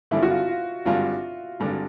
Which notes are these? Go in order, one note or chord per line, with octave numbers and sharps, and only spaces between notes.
G#1 G2 D3 E4
F#4
F4
F4
G#1 G2 D3 F4
G#1 G2 D3